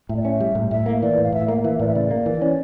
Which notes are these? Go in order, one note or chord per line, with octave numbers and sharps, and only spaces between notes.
A2 E5
D5
C#4 E5
G3
A2
A2 E5
A#3
E3 D5
A2
F5
A2 E5
A#3 F5
E3 E5
A2 D5
E5
C#3 D5
A#3
E3
C#4